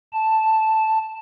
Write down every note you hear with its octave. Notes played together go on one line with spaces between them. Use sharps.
A5